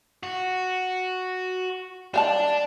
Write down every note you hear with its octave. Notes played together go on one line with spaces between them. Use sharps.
F#4
G3 D4 F5 A5